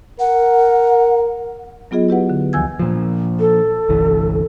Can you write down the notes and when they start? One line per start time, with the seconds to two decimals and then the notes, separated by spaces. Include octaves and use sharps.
0.19 A#4 F#5
1.91 F#3 B3 F4 G#4 D#5
2.09 E4 G4 B4 F#5
2.29 D3
2.53 D2 D#3 F3 G#5 E6 G#6
2.79 A#2 F3
3.40 A4
3.89 G1 C2 E3